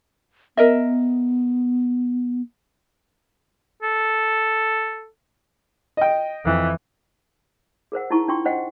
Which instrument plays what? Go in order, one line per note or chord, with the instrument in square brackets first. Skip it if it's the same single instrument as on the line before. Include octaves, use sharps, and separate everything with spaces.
[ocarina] B3 [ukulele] A#4 D#5 E5
[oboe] A4
[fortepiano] D#5 G5
[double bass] F2 E3
[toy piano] G#4 A#4 C5 F#5
D#4 E4 A5 C#6
D4 F4 G5 C6 C#6
C5 D#5 F#5 G5